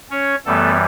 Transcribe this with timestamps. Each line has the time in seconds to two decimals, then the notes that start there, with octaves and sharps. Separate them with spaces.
0.10 C#4 C#5
0.46 F#2 E3 G3 A3 B3 A4